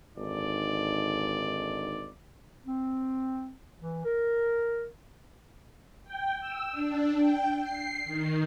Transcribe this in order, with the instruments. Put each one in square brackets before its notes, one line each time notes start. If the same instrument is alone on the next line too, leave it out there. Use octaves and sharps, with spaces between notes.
[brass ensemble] G#1 D3 D#4 D5
[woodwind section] C4
E3
A#4
[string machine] G5
E6
D4
G5
C7
D#3